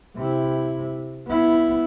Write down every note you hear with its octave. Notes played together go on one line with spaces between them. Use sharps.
C3 E4
B3 E4